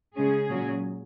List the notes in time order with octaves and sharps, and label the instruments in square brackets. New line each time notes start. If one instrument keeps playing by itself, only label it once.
[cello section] C#3 G#3 C#4 G#4
A#2 F#3 C#4